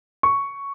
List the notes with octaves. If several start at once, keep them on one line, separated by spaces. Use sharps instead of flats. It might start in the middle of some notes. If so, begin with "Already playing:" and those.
C#6